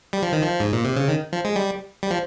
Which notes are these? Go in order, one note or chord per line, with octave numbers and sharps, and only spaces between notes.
G3
F3
D#3
F3
G#2
A#2
C3
C#3
D#3
F3
G#3
G3
G3
F3